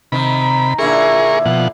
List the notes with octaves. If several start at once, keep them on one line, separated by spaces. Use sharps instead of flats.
C3 D#3 B5
A#2 D3 E4 G#4 A#4 C#6
B2 F3 F#5